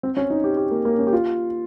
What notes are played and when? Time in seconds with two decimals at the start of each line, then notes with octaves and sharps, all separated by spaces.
0.03 C4
0.17 C#4
0.30 D#4
0.44 G4
0.57 G4
0.71 A#3
0.85 A#3
0.99 C#4
1.07 G4
1.13 F4